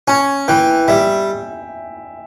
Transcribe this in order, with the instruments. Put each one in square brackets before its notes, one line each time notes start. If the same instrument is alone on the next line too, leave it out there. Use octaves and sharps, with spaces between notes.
[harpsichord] C#4 [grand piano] G#5
[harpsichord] E3 [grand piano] G5
[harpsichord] G3 [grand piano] E5